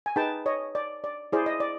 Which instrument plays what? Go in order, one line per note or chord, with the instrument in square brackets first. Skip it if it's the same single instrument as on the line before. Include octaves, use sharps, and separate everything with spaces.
[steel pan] G#5
D#4 G#4 B4 G5 A5
C#5 D#5
D5
D5
E4 G#4 C5 D5
D#5
D5